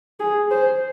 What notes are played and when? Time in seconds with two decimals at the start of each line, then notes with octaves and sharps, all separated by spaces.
0.20 G#4
0.51 C5